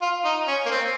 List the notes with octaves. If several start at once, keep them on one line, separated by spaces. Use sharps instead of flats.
F4
D#4
C#4
A#3
C4